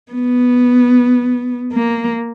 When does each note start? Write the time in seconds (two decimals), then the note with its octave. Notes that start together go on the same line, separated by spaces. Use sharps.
0.12 B3
1.73 A#3